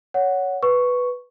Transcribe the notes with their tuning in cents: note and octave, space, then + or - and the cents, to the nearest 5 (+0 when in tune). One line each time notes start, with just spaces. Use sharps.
C#5 +15 F#5 +0
B4 +0 C#6 +0